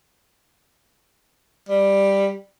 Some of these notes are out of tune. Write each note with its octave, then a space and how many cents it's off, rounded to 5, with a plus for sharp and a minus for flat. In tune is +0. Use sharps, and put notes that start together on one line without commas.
G3 +5